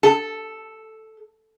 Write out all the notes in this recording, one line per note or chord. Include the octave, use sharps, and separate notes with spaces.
A4